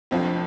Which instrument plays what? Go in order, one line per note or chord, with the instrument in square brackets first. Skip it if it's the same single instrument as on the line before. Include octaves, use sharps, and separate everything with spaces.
[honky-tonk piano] F1 F2 F3 D4 [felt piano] C4